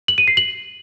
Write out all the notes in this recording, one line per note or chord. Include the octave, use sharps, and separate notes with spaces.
F#7
D#7
C7
F#7